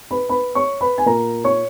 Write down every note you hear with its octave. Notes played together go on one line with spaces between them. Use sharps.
B4 B5
B4 B5
C#5 C#6
B4 B5
G#5
A#2 A#4 A#5
C#5 C#6